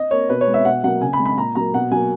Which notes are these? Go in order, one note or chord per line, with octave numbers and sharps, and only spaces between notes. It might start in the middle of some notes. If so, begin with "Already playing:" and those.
Already playing: D#5
A#3 C#5
B2 B4
C#5
G#3
E5
B2 F#5
F#3 A#3 F#5
C#3 G#5
B5
G#3
B5
A#2 A#5
F#3 A#3 A#5
B2 F#5
F#3 A#3 G#5